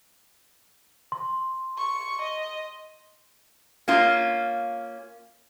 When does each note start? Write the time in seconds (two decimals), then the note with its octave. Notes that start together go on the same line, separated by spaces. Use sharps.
1.12 C6
1.78 C#6
2.22 D#5
3.88 A#3 C#4 F4